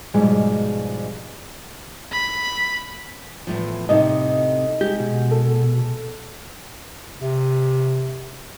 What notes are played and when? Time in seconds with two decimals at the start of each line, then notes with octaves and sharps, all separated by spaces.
0.14 G#2 B2 F3 G3 G#3
2.12 B5
3.47 E2 A2 F3
3.89 A2 C3 D#4 A4 D#5
4.81 G#3 G4
5.00 B2
5.31 A4
7.19 C3